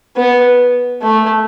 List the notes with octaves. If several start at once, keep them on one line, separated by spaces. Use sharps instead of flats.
B3
A3